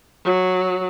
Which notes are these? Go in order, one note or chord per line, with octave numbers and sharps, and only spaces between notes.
F#3